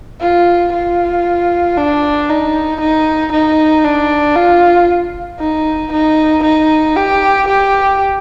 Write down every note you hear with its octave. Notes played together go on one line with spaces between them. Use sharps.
F4
F4
D4
D#4
D#4
D#4
D4
F4
D#4
D#4
D#4
G4
G4